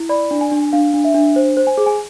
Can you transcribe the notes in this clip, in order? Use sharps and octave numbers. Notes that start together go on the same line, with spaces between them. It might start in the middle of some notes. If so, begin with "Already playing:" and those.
Already playing: E4
D5 B5
D4
G#5
D4
D4 F5
D4
E5
D4
C5
C5
G#5
G#4
G#5